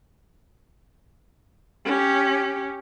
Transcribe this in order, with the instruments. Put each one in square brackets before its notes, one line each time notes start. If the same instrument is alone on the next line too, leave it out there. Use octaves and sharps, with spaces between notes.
[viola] C#4 G4